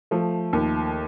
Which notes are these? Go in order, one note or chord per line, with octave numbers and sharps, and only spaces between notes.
F3 A3
D#2